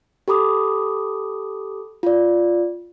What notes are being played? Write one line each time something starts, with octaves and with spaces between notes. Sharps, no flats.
G4 A4 B5 D6 D#6
F4 D5